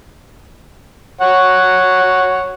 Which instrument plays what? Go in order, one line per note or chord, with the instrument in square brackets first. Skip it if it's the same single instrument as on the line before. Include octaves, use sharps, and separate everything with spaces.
[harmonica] C#5 F#5